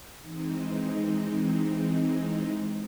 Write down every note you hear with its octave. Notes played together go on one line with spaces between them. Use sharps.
E3 G#3 C4 D#4